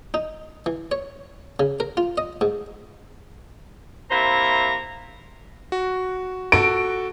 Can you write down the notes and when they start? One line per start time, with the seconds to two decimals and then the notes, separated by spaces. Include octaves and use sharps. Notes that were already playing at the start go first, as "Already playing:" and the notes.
0.14 D#4
0.66 E3
0.92 C#5
1.60 C#3
1.80 A#4
1.97 F4
2.18 D#5
2.41 G#2
4.11 C3 A#3 E4 C5 A#5
5.72 F#4
6.52 F#4 A4 D7